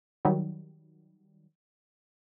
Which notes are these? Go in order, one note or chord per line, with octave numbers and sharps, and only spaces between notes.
D#3 F#3 G3